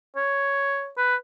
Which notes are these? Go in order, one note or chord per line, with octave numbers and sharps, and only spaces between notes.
C#5
B4